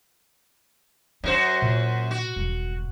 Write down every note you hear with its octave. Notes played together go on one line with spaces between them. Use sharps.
F#2 C#4 F#4 C5
A#2
F#4
E1 G2